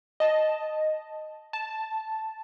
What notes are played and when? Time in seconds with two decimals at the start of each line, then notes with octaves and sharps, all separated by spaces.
0.20 D#5 A5
1.53 A5